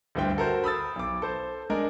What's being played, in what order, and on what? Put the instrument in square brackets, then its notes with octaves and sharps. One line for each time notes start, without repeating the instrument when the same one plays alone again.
[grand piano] D2 G2 E4 C5 G5
F#4 A4 A#4 C5
B5 D#6 E6 A6
B1 D6
A4 C5
G#3 D4 A#4 D#5 G#5